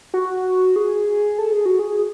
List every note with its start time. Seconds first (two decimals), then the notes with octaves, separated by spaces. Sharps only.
0.14 F#4
0.76 G#4
1.39 A4
1.52 G#4
1.66 F#4
1.79 G#4